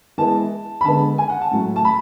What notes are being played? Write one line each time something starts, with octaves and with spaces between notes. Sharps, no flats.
E3 G#3 B3 E4 A5
B5
D3 G#3 B3 A5
G#5
F#5
A5
A2 F#3 A3
A5
B5